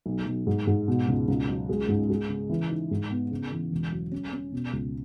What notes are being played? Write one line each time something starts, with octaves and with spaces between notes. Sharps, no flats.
B1
B1
G#2
G#2
B2
C#2
C#2
F#3
G#3
G#2
G#3
C#3
E3
D#4
G#2
B3
C#3
E3
E1
F#3
C#4
C#4
B2
C#2